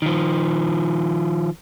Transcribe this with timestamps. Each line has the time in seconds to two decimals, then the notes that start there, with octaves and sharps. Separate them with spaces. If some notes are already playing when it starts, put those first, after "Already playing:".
0.02 D#3 F3